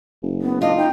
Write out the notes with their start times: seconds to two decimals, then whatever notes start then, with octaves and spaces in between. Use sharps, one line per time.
0.22 F#1
0.42 B3
0.62 D4 F4 D#5
0.77 D#4 G5